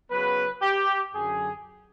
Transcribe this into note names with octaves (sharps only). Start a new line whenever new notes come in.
C#3 F#3 B3 B4
G4
F#2 D3 F#3 G#4